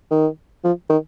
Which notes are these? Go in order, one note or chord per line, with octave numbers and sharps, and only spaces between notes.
D#3
F3
D#3